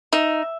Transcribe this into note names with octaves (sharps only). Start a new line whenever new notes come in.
D#4 E5